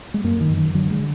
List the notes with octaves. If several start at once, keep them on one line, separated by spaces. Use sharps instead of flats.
G#3
F#2 A#3
D#3
F#2
D#3
D3 F#3
G#3
D3